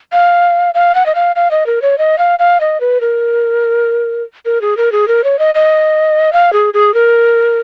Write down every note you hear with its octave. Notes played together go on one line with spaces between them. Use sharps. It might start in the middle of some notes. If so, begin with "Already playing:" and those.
F5
F5
F#5
D#5
F5
F5
D#5
A#4
C#5
D#5
F5
F5
D#5
B4
A#4
A#4
G#4
A#4
G#4
A#4
C#5
D#5
D#5
F5
G#4
G#4
A#4